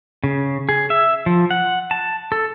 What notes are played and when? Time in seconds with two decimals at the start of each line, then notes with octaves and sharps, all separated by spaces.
0.24 C#3
0.69 G#4
0.90 E5
1.26 F3
1.51 F#5
1.91 A5
2.32 A4